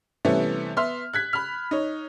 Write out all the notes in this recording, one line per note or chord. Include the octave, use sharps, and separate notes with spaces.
C3 E3 G3 A3 B3 C#4
B3 E5 C6 F6
F#6 G#6 B6
B5 F6
D#4 C#5